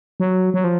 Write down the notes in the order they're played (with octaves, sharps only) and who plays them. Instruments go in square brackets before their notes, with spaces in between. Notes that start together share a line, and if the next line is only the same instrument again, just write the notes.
[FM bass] F#3
F#3
F3